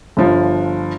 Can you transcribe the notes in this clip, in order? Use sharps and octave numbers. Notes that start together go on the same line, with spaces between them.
G1 F3